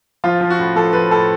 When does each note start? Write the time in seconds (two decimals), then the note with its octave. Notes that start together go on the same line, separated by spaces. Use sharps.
0.24 F3 F4
0.41 F3
0.50 F#4
0.59 A2
0.76 F3 A4
0.93 F3 B4
1.11 A2 A4